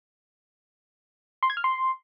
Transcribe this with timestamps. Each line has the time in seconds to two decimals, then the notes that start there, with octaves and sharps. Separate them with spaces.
1.43 C6
1.50 G#6
1.57 F6
1.64 C6